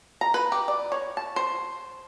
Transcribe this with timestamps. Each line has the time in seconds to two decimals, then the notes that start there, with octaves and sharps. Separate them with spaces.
0.21 A#5
0.34 B4
0.52 G4
0.68 D5
0.92 C#5
1.17 A5
1.36 C5